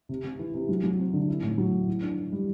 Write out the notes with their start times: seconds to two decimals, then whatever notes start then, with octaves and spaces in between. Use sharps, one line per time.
0.09 C3
0.25 C3
0.39 E3
0.54 C3
0.69 F#3
0.84 F#3
0.99 C4
1.13 D3
1.28 E4
1.43 A2
1.58 F#3
1.72 A2
1.87 E3
2.02 D4
2.18 E3
2.32 G3